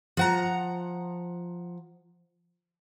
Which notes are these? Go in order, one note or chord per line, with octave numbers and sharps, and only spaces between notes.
F3 F#5 A#5